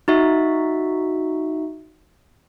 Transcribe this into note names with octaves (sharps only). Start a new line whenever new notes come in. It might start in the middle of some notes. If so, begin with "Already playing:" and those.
D#4 F#4 E5